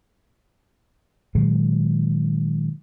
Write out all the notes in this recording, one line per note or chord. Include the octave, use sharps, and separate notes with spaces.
A#2 D#3 F#3 G#3